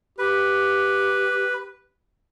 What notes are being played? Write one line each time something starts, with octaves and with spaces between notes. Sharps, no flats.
G4 B4